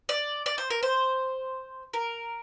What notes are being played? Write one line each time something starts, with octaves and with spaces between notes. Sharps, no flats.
D5
D5
C5
A#4
C5
A#4